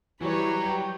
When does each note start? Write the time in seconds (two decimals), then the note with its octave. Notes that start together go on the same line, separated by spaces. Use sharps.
0.21 E3 F#3 G3 B4 C#5
0.62 G5